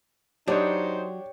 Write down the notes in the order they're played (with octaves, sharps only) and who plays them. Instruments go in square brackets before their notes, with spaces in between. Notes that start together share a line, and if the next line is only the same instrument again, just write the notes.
[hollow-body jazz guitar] F#3 [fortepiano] D4 [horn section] D#4 C5 [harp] G4 C#5